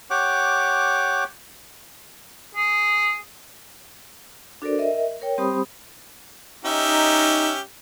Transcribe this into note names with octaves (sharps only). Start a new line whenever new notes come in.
G4 C#5 F#5 D6
G#4
D4 F#4 A4 A#4 C5 D5
A#4 D#5 E5
A#4 C#5 G5
G3 C4 G4 C5 B5 D#6
C#4 D#4 G4 E5